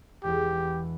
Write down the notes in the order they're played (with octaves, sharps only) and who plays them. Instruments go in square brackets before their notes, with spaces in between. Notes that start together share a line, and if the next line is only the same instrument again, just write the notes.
[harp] E1 E2 [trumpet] G4